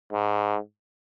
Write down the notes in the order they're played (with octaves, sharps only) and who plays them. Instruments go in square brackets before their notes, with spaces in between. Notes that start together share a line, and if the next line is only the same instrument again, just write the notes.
[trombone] G#2